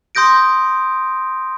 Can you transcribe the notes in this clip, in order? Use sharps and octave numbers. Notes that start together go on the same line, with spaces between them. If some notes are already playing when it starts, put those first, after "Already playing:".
C6 D#6 G6 A#6 D7